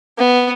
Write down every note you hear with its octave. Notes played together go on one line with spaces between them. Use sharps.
B3